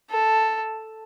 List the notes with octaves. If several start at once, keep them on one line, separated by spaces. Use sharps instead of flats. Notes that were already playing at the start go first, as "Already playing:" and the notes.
A4